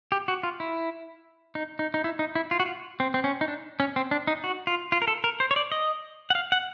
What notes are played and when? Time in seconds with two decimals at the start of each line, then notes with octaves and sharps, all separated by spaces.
0.12 G4
0.28 F#4
0.43 F4
0.60 E4
1.55 D#4
1.79 D#4
1.94 D#4
2.04 E4
2.19 D#4
2.35 E4
2.51 F4
2.60 F#4
2.66 F4
3.00 C4
3.14 C4
3.24 C#4
3.41 D#4
3.48 D4
3.80 C#4
3.96 C4
4.11 D4
4.27 D#4
4.44 F#4
4.67 F4
4.92 F4
5.02 A#4
5.08 A4
5.24 A#4
5.40 C5
5.51 C#5
5.56 D5
5.72 D#5
6.30 F#5
6.35 F5
6.52 F#5